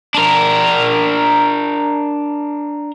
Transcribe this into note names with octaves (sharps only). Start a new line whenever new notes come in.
D4 A#4